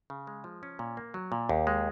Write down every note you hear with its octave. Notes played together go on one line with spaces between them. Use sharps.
C#3
G#3
F3
C#4
A#2
A#3
F#3
A#2
D#2
G#3